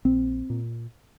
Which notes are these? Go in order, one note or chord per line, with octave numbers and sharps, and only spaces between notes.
A#1 C4
A#2